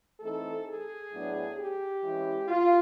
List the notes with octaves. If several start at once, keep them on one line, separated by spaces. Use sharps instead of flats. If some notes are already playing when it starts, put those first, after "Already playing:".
E3 A3 C4 D#4 A4
G#4
A2 F#3 B3 D4
G4
E3 G#3 C#4
F4